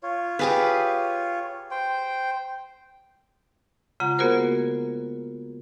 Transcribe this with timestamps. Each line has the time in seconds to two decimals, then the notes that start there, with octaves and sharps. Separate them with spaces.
0.03 F4 C#5
0.39 G4 G#4 B4
1.71 C5 G5
4.00 C#3 G#3 F4 F#5 A#5
4.19 A#3 B3 F#4 G#4 A#4 C5